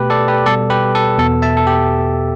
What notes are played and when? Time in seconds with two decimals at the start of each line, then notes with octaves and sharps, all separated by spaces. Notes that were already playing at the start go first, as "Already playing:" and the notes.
Already playing: B2 A3 G4 B4
0.10 A4 D5
0.28 G4 B4
0.45 B2 G3 B3 A4 D5
0.70 G4 B4
0.95 A4
1.18 E2 B2 B3 A4
1.42 E5 A5
1.57 A4
1.67 G4